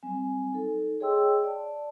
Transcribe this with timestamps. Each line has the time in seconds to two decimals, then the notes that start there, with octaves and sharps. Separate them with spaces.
0.03 F#3 G3 C4 G#5
0.53 D#4 A4
1.00 G#4 C#5 D#5 G5 C6 E6
1.44 D5 A5